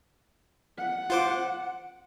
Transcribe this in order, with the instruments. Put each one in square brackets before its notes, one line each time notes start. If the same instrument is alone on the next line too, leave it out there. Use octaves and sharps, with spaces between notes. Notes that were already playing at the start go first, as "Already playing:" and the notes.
[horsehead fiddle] F#5
[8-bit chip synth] F4 C5 D6